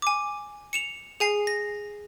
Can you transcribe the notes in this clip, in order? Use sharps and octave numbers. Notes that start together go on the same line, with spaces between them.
G#5 D6
C#7 E7 F7
G#4 G#5 C7
A#6